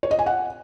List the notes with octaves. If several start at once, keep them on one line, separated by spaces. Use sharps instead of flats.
C#5
D#5
G#5
F#5